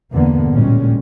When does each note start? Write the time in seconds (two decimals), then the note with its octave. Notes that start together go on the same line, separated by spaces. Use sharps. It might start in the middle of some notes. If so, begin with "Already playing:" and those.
0.12 E2 G2 B2 D3 A#3 B3
0.52 A1 D2 A#2 G3 G#3 C#4